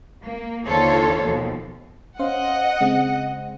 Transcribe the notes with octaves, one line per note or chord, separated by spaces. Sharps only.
A#3
D#2 D3 F4 A4 C5 C#5
D#2 B2 F3
C#4 C5 D#5 F5 F#5
C#3 G#3 C4